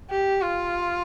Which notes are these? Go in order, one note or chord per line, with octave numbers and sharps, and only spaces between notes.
G4
F4